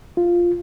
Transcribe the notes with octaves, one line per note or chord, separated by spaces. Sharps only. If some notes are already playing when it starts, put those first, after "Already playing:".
F4